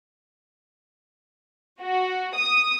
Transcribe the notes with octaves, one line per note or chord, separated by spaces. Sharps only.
F#4
D#6